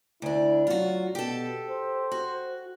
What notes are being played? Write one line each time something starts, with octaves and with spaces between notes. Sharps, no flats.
D2 D4 E4
F#3 F4 F#4
B2 G4 A4
C5
F#4